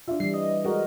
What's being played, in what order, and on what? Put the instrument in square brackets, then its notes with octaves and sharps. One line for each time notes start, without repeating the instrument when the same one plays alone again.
[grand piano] D4 E5 [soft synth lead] F4
[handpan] E3 G3 [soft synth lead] C7
[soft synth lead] D#5
[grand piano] G#3 F#4 [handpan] A#4